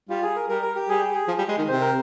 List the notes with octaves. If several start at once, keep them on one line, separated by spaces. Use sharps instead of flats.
G3 F4
G#4
A#4
G3 A#4
A#4
G4
G3 G#4
G4
G#4
F3
G3
G#3
D#3
C3 C5
A#4